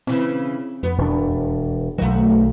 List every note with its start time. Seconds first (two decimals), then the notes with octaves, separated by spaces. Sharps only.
0.07 C#3 E3 C4
0.83 F2 B3
0.98 E1 D4
1.98 B1 D#3 F#3 A3 F#4